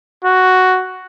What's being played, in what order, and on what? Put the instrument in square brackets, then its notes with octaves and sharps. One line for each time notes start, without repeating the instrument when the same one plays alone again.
[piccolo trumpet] F#4